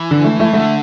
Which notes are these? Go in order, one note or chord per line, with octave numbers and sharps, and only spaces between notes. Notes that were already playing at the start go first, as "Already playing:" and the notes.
Already playing: E3
D3
A3
A3
D3 A3